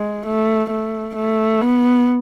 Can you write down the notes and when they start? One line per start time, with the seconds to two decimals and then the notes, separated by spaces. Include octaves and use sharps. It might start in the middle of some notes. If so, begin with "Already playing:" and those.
Already playing: G#3
0.26 A3
0.70 A3
1.16 A3
1.61 B3